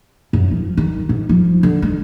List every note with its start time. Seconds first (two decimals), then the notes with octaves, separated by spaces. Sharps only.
0.33 F#2
0.51 F3
0.77 D#3
1.09 G#2
1.29 F3
1.63 D3
1.82 G#3